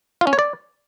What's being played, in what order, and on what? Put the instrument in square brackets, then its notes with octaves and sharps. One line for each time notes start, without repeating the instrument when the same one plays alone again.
[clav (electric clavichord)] F4
C#4
C#5
D5